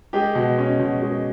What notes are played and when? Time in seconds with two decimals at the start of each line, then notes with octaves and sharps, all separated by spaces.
0.13 G#3 G4
0.35 B2
0.58 C#4
0.80 B2
1.02 G#3